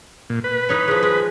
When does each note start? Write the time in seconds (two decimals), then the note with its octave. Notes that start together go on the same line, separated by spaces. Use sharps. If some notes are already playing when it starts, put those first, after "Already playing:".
0.30 A#2
0.44 B4
0.69 E3 D#4 C#5
0.88 F3 G#3
1.03 G#3